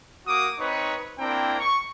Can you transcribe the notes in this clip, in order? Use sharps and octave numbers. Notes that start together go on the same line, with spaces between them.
A#3 F#4 D6 D#6
C4 D#4 B4 C#5 C#6 D#6
A#3 C4 D4 E4 G5 A#5
C#6